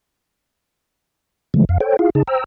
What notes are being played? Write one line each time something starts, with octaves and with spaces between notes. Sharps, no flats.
C#3 E3 F3 G#3 A3
F2 F5
A4 C5 C#5 G5
E4 F4 G#4 F5
C#3 D#4 G#4 A5
C5 G5 A#5 E6